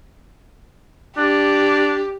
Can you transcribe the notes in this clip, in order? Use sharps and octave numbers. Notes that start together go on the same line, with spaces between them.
D4 G4